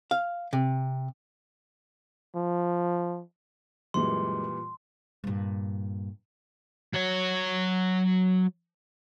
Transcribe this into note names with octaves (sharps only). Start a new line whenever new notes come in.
F5
C3
F3
F#2 A#2 E3 G3 G#3 C6
G2 A#2
F#3 C#5